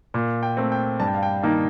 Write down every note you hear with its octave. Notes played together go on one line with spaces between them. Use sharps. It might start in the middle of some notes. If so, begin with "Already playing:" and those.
A#2
G5
A3 C4
G5
G2 A5
G5
F5
G5
D#3 A#3 D#4 A5